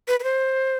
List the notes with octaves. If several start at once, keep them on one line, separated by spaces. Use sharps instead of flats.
B4
B4
C5